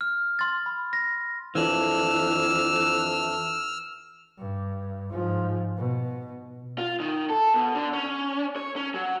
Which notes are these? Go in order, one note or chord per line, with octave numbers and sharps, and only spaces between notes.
F6
C6 A6
B5
A#6
F2 E3 D4 E6 F6
G2
G#2 F3
B2
F4
D#3
A4
B2
D3
C#4
C#5
C#4
F#3